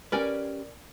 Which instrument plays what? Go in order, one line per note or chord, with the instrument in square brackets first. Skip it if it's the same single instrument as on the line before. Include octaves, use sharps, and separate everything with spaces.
[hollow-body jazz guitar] C#4 G4 B4 [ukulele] A#4 D5 G#5